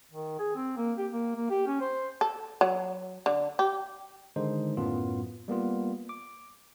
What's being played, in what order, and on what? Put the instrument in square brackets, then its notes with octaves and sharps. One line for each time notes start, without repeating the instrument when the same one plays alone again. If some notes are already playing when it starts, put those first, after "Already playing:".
[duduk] D#3
G#4
C4
A#3
G4
A#3
A#3
G4
C#4
C5
[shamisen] A4
F#3
D3
G4
[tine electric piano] D3 D#3 G#3 D#4 C5
F#2 A2 F#3 B3 F4
G3 A#3 B3 F4
D6